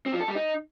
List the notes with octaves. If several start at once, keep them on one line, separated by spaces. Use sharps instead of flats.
C4
F3
A4
G3
D#4